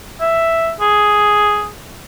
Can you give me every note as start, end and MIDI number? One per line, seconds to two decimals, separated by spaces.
0.21 0.72 76
0.80 1.68 68